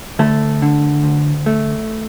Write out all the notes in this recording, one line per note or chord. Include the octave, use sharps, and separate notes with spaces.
D2 A3 A4
D3
D2
A3